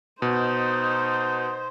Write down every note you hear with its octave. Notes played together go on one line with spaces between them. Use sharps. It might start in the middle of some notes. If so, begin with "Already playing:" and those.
B2 D#4 C5